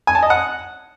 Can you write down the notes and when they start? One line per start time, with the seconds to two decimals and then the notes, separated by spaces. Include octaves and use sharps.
0.07 G#5
0.15 A5
0.23 D#5
0.30 F#5